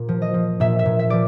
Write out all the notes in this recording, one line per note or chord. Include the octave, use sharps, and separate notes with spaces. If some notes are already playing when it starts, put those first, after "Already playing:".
Already playing: A#2
F3
D#5
F3
A#2 E5
E5
A#2
E5
F3 D5